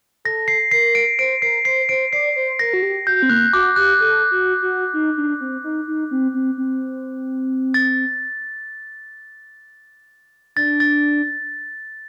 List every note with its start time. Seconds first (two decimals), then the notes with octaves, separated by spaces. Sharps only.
0.25 A4 A#6
0.48 C7
0.71 A#4 C7
0.95 D7
1.19 C5 D7
1.42 A#4 C7
1.65 C5 C7
1.89 C5 D7
2.13 D5 C7
2.36 C5
2.59 A#4 A#6
2.73 F#4
2.82 G4
3.06 F#4 G6
3.23 C4
3.29 A#3 F#6
3.53 F#4 D6
3.76 G4 F#6
3.99 A4 F#6
4.31 F#4
4.62 F#4
4.93 D#4
5.17 D4
5.41 C4
5.64 D#4
5.88 D#4
6.11 C4
6.34 C4
6.58 C4
7.74 A6
10.56 D4 A6
10.80 A6